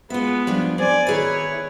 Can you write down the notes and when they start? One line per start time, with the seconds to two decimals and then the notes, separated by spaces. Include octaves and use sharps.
0.10 G#3 B3 F4 E5
0.47 F3 G3 D4
0.78 C4 D5 G#5
1.07 D#3 E4 G#4 B4 C#5